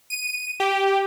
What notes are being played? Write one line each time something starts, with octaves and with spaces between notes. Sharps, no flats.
D#7
G4